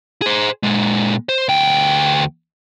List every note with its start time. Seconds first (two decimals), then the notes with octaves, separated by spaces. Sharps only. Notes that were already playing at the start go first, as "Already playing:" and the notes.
0.22 G#4 C5
0.63 A#2 G#3
1.29 C5
1.49 D2 G5